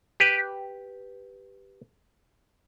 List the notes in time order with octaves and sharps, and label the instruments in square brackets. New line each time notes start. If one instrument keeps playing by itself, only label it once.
[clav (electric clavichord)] G4 B4